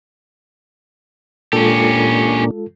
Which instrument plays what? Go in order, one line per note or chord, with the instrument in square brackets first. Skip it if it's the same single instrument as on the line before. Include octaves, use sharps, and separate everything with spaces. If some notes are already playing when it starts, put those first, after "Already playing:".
[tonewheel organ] A#2 A#3 D4 [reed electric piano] G#3 F4 A4 [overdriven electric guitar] C#4 G4